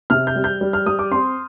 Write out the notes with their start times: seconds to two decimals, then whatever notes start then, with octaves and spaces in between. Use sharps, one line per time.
0.10 C3 F6
0.27 G6
0.35 G3
0.44 G6
0.61 G3
0.73 F6
0.86 G3 D#6
0.99 D6
1.11 C4 C6